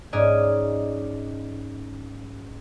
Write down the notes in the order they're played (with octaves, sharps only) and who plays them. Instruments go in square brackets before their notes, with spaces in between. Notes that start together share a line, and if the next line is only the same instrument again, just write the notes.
[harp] G#2 C#4 D5 D#6 F6 G#6